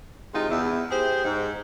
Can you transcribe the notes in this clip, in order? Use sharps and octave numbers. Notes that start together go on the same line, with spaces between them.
C3 G#3 D#4 F4
E2 E4
G4 G#4 C5
G#2